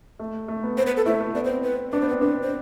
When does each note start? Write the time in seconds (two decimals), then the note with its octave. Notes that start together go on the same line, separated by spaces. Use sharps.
0.19 A3
0.48 A3
0.63 B3
0.77 B3 C5
0.87 B4
0.97 A4
1.06 A3 E4
1.20 A3
1.35 B3 D5
1.44 C5
1.49 C4
1.64 B4
1.92 D4 B4
2.01 B3 C5
2.08 B4
2.11 C4
2.21 D4 B4
2.43 C5